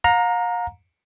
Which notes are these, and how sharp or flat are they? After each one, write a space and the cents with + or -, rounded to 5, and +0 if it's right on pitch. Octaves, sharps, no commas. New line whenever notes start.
F5 +40 A#5 +0